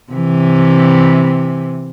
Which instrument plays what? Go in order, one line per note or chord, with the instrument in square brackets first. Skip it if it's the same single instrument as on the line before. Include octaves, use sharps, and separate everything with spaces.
[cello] C3 E3